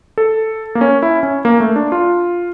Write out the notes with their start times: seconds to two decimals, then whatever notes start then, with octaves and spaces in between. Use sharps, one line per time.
0.18 A4
0.75 A#3
0.81 C#4
1.02 E4
1.23 C#4
1.45 A#3
1.60 A3
1.76 D4
1.92 F4